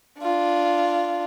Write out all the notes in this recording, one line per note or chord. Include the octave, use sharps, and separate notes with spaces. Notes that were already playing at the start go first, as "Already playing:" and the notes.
D4 F4